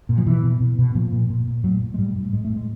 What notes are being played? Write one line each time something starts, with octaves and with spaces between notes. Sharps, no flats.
A#2
F3
B2 E3
B2
B2
B2
A#2 F3
A#2
A#2
A#2
A2 F#3
A2
G#3
A2 G3
A2
A2 G#3
A3
A2
G#3